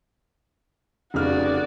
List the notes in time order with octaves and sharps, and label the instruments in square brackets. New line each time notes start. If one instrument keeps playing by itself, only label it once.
[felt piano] F1 C#3 F6 [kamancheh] F#4 D5